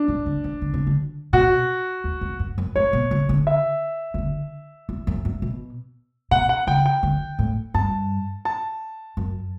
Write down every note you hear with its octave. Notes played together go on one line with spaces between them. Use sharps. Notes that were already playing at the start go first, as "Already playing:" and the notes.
Already playing: D4
A2
D3
E3
D3
C#3
D3
B2 F#4
E2
E2
F#2
F#2
A2 C#5
B2
C#3
D3
E5
C#3
D3
E2
F#2
G2
B2
B2 F#5
F#5
C#3 G5
G5
D3
A2
G2 A5
A5
F#2